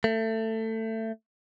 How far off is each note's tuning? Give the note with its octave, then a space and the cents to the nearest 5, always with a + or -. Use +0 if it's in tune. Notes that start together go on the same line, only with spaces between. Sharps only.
A3 +20